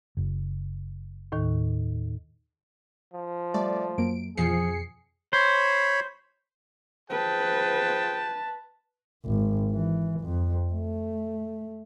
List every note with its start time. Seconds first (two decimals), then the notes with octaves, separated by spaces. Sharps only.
0.17 F#1
1.32 D#2 A2 D#3
3.14 F3
3.54 G3 A3 D5
3.98 F#2 F#3 A#3 A#4 D7
4.37 F2 B2 E3 F3 G#4 C7 C#7
5.33 C5 C#5 B5
7.10 F3 G#4 B4 G5 A5
9.25 G#1
9.72 E3
10.21 F2
10.74 A3